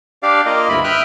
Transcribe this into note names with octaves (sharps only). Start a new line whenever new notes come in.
D4 G4 D5 F5
A#3 F4 A#4 D#5
D2 G2 E4 B5
E5 G5 D#6 F6 F#6